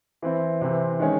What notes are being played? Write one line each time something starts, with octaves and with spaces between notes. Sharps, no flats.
E3 C4 E4
C3 E3 C4
D#3 G#3 C#4